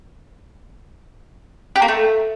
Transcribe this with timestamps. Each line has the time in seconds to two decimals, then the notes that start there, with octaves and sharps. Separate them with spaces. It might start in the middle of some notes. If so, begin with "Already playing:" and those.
1.76 G4
1.82 A#3
1.88 A3